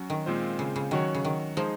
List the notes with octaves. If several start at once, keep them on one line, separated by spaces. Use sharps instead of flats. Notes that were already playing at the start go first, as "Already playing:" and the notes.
Already playing: F#3 C#4 F#4
D#3
A#2 G#3 C4 F4 C5
C#3
C#3
D#3 F#3 C#4 F#4 C#5
C#3
D#3
F3 G#3 D#4 G#4 C5 D#5